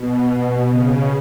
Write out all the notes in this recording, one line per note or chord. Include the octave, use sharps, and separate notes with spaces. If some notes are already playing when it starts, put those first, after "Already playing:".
Already playing: B2
C#3